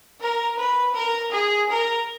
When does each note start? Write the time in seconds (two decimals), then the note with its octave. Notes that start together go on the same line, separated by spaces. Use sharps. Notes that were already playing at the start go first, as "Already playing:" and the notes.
0.21 A#4
0.57 B4
0.94 A#4
1.32 G#4
1.70 A#4